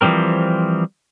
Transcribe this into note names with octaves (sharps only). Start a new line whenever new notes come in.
E3 F3 G3 C4 A#4